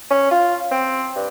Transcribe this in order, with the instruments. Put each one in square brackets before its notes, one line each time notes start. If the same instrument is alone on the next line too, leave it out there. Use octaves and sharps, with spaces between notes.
[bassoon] C#4
F4
C4
G2